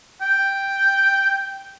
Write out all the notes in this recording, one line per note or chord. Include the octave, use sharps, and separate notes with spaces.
G5